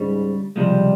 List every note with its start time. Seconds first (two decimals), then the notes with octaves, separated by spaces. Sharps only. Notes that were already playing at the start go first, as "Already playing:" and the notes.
Already playing: C#2 G#2 C#3 G3
0.56 C#2 C3 F3 G3 G#3